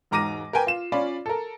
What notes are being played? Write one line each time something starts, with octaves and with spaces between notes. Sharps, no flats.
E1 G#2 A#5 D6 A#6 D#7
A#4 B4 G5 G#5
F4 E7
C#4 F4 D5 B5
A4 A#4